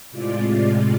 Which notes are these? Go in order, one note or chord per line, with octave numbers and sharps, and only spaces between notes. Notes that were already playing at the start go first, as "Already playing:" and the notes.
A2 C3 G#3 F4 D5